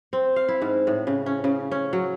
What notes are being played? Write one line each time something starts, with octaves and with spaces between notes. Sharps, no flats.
C4
F5
E4
G#2
A2
C#3
C#4
C#3
C#4
F#3